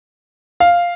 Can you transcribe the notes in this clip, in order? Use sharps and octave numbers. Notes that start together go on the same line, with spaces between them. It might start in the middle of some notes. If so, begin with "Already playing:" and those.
F5